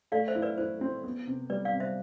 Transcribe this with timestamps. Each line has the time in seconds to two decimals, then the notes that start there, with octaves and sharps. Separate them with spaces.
0.12 A3 D5 F5
0.28 C5 E5
0.35 E4
0.42 B4 D5
0.58 E4 C5
0.81 C4
1.04 B3
1.27 C3
1.50 G3 B4 D5
1.65 D5 F5
1.73 C3
1.80 C5 E5